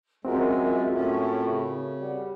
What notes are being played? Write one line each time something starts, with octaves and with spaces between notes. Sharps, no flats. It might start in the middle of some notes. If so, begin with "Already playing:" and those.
F#2 G#3 C4 F4 F#4 A#4 E5
A2 C#4
C#3
G3 F#5